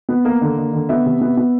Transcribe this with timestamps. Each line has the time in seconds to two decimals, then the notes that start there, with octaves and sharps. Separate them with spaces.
0.09 B3
0.25 A#3
0.41 D3
0.58 A#3
0.73 D3
0.89 B3 E5
1.06 C3
1.21 B3
1.37 B3